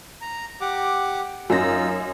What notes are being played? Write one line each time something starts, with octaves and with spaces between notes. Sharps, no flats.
A#5
G4 F#5 D6
F#2 C#4 D#4 F4 E6 A#6